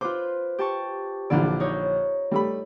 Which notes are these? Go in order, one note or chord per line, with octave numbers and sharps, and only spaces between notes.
F4 B4 C5 D6
G4 A5 C#6
A#1 D3 E3 D5
D#4 C#5 G6
G3 A3 B5